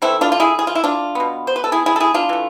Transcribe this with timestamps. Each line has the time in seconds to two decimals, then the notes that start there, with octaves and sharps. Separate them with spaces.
0.02 E3 A3 C4 E4
0.21 D4 F4
0.32 F4
0.40 E4 G#4
0.59 G#4
0.67 F4
0.75 E4
0.84 D4 F4
1.15 B2 B3
1.47 C5
1.56 B4
1.64 A4
1.72 E4 G#4
1.86 E4 G#4
1.96 A4
2.00 E4 G#4
2.14 D4 F4
2.29 E3 A3